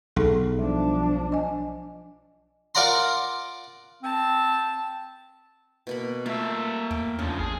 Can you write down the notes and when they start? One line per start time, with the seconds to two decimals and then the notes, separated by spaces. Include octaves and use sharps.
0.16 B1 D#4 G#4 A4
0.59 F3 G3 D4
1.32 D#5 G#5
2.75 F4 A#4 D5 F#5 A#5 C6
4.03 C4 A5
5.87 B2 A#3 B5
6.26 A3 A#3 F4 E5
6.91 E2 G5
7.19 C#3 F3 D4
7.39 A1 G#4